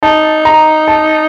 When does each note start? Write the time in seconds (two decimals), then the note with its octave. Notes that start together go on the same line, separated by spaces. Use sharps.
0.03 D#4 A5
0.45 A#5
0.88 A5